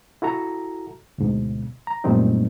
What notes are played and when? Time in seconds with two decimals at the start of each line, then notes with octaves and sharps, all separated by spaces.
0.22 E4 F#4 A4 A#5
1.18 D2 G#2 B2
1.87 A#5
2.04 F#2 A#2 G3 A3 C4 D#4